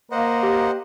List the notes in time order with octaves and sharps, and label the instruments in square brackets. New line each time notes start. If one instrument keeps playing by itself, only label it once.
[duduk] A#3 [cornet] A#4 [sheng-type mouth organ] C5 D#5 F#5
[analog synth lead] G4